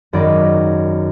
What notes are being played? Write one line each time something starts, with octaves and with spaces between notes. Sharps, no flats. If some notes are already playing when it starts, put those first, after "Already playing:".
G#1 F#2 D#3 D#4 D5 B5